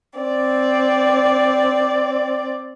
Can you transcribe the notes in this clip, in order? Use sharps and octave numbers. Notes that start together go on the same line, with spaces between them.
C4 D5